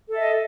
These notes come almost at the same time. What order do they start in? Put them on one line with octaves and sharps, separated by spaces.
A4 E5 D#5